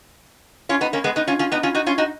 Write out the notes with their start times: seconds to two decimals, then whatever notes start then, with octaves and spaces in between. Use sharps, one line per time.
0.69 C#4 F4
0.81 B3 D#4
0.93 A#3 C#4
1.04 G#3 B3
1.16 B3 D#4
1.27 C#4 F4
1.39 C#4 F4
1.52 B3 D#4
1.63 C#4 F4
1.75 D#4 F#4
1.86 C#4 F4
1.98 D#4 F#4